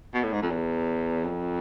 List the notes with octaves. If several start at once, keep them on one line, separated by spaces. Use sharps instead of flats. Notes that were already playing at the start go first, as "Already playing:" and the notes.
B2
A2
G#2
F2
E2
F2